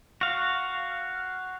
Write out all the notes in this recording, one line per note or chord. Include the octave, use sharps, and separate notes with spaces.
F#4 F5